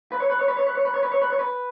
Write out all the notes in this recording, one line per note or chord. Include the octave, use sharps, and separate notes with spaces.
B4
C#5
B4
C#5
B4
C#5
B4
C#5
B4
C#5
B4
C#5
B4
C#5
B4